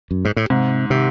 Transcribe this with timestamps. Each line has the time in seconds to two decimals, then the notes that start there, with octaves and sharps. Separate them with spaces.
0.11 F#2
0.25 G#2
0.36 A2
0.50 G#2 C3
0.90 C3 D#3